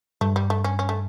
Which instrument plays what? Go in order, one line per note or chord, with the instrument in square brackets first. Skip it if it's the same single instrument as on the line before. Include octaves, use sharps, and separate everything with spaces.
[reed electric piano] G2 [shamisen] A3
[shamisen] G3
A3
C#4
C#4
A3